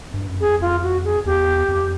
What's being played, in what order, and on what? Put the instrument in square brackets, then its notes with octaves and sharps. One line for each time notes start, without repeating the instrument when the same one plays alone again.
[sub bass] G2
F#2
[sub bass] F2 [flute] G#4
[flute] F4
F#4
G#4
[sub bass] E2 [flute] G4
[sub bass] F2